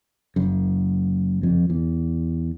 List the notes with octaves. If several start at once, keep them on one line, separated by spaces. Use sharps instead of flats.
F#1 F#2
F2
E2